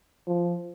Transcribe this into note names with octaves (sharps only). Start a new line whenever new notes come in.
F3